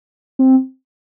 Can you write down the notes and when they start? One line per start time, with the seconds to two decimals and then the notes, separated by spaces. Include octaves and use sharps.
0.39 C4